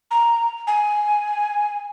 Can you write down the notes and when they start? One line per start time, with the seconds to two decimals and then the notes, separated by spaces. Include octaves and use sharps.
0.11 A#5
0.67 G#5